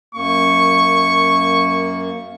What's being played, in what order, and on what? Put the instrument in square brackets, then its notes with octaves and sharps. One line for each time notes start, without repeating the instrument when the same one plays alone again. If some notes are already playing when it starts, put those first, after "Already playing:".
[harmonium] F#2 A#3 [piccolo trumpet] C#6